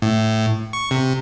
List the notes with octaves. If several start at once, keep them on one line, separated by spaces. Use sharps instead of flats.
A2
C#6
C3